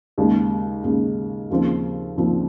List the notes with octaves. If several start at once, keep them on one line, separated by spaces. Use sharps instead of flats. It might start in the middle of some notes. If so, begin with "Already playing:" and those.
D#2 C#3 G#3
D#2 C#3 G#3
D#2 C#3 F3 C4 F4
D#2 C#3 F3 C4 F4